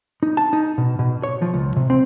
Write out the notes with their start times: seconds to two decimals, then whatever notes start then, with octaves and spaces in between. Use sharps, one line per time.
0.23 D#4
0.37 A5
0.53 D#4
0.78 B2
0.99 B2
1.23 C#5
1.42 F3
1.54 C#2
1.76 C3
1.90 C4